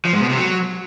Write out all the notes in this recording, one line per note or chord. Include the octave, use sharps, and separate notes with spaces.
F3
G#2
B2
C3
F#3